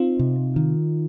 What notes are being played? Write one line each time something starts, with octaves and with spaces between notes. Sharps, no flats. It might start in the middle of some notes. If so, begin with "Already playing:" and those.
Already playing: C4 D#4 F4
C3
D#3